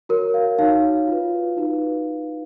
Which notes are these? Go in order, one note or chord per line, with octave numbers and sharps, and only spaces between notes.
F#4 A#4 C#5
F5
D#4 F#4 C#5 F5
F4 B4
D#4 F#4 B4